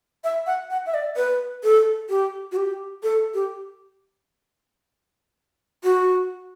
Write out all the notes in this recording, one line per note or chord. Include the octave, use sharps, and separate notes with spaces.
E5
F#5
F#5
E5
D5
B4
A4
G4
F#4
G4
A4
G4
F#4